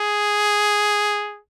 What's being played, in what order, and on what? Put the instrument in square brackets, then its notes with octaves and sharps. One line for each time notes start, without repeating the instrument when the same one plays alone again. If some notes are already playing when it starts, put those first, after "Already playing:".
Already playing: [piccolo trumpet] G#4